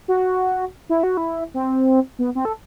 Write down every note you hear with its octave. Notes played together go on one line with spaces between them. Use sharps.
F#4
E4
F#4
E4
C4
B3
C4
A4